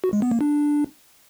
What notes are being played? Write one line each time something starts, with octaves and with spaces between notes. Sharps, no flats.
F#4
G#3
B3
A#3
D4